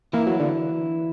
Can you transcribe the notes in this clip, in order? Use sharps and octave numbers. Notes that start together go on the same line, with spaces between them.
E3 A#3 E4
F#3
D3